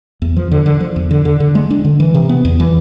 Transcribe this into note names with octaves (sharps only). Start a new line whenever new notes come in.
E2
F3
D3
D3
F3
E2
D3
D3
D3
G#3
D4
D3
E3
C3
B3
E2
E3